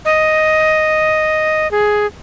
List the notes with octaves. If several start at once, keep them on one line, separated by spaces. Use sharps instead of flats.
D#5
G#4